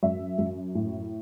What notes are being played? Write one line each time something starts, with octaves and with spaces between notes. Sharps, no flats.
F#2 E5
F#2
A2